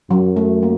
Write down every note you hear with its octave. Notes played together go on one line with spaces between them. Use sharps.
F#2 F#3
A3
A#3